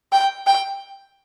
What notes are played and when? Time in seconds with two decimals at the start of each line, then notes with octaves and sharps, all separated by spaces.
0.12 G5
0.47 G5